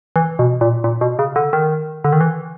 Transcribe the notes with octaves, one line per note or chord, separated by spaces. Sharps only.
E3
B2
A#2
A#2
B2
C#3
D3
D#3
D3
D#3
E3